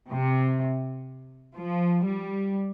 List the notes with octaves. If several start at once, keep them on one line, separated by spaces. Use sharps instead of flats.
C3
F3
G3